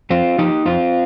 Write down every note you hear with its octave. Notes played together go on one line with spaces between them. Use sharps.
F2 C4 F4
F3 D#4 G4
F2 C4 F4